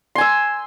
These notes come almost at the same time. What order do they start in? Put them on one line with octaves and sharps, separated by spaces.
C6 G#5 E6